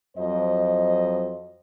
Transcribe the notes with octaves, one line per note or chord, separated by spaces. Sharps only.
F2 F#3 C5 D#5